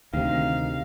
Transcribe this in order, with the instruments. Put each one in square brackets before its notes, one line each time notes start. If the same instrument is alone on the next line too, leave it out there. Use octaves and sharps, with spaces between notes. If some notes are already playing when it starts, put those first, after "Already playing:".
[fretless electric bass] D2 C3 [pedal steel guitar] D#3 [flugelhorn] F5